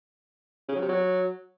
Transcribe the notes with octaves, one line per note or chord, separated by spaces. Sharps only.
C#3
F#3
C3
F#3